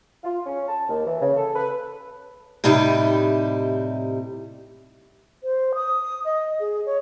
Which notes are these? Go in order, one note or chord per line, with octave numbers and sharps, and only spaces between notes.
F4
C#4
A5
D#2
E3
C#3
A4
B4
A2 C3 G3 D#4 E4
C5
D#6
D#5
G#4
C#5